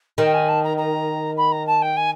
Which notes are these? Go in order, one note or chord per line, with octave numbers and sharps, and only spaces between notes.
D#3 G5
G#5
A5
A#5
A#5
B5
A#5
A5
G5
G#5